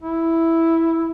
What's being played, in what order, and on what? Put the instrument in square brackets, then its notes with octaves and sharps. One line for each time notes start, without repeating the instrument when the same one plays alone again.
[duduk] E4